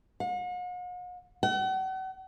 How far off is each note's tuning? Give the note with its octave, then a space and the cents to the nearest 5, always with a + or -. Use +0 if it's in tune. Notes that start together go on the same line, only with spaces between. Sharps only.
F#5 -45
F#5 +40